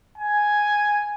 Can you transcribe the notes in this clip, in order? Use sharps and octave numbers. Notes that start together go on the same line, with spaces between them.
G#5